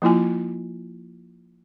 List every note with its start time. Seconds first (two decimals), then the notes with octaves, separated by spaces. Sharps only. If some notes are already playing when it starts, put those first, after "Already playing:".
0.02 F3 A#3 E4 F4 G#5